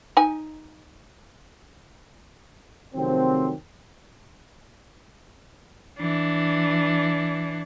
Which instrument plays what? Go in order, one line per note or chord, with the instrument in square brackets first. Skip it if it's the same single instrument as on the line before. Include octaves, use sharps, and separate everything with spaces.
[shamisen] D#4 G#5
[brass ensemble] C3 D#3 F3 F#3 A3 C4
[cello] E3 D4